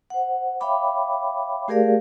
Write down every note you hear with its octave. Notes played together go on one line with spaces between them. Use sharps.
C5 F#5
C#5 E5 F5 G5 B5 D6
A3 G4 G#4 A#4 D5 F5